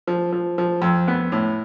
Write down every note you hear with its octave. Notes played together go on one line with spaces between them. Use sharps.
F3
F3
F3
F2
B3
A2